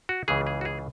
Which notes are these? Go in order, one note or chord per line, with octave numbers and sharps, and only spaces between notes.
F#4
C#2 C#3 E3 G#4
G#4
F#4
G#4